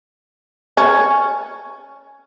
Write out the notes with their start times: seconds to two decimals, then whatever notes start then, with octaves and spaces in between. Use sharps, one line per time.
0.77 C#4